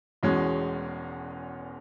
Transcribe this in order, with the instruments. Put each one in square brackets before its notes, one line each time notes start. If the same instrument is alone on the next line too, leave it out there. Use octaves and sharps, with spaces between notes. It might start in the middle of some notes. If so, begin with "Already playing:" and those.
[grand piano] E1 E2 B2 G#3 C#4